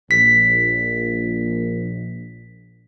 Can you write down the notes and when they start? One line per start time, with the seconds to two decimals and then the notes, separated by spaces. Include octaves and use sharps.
0.11 A#1 B6